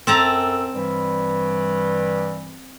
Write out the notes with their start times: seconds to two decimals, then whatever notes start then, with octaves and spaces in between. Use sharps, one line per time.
0.07 F#2 C4 A4 A5 A#5
0.74 G2 E3 G3